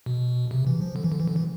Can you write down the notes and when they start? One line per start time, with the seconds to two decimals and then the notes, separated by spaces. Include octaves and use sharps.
0.06 B2
0.51 C3
0.67 E3
0.81 F3
0.96 D3
1.04 E3
1.12 D3
1.20 E3
1.28 D3
1.36 E3